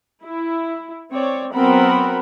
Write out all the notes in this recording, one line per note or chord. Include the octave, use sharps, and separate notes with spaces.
E4
C4 C#5 D5
F#3 B3 C4 A#4 F#5 B5